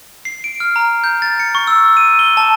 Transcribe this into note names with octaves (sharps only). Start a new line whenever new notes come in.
C7
D7
F6
A#5
G6
A6
C#7
C#6
E6
D#7
G7
A5